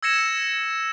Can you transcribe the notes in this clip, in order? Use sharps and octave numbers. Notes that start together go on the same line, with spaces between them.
E6 G#6 A#6 C#7 E7